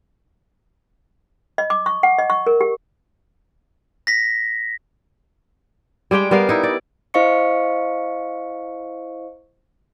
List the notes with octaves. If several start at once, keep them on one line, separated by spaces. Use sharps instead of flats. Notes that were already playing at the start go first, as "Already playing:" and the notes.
D#5
D6
C#6
F#5
D#5
C#6
A#4
G4
A#6 B6
G3 G#3 G4 G5
G3 B3 A#4 F5
D#4 E4
D5
E4 C5 D#5 F5 C#6 C#7